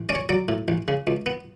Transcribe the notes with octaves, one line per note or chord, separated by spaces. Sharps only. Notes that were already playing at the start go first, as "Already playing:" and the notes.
Already playing: A1
C#4 D5
C#5
F#3 D5
A2
A1
C#3
C#2
B3